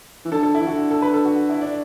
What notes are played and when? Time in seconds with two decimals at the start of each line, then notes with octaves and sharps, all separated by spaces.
0.25 E3
0.31 D3 A4
0.43 A4
0.55 E4
0.61 E3
0.67 D3 F#4
0.91 A4
1.02 B4
1.14 A4
1.25 F#4
1.50 E4
1.61 D4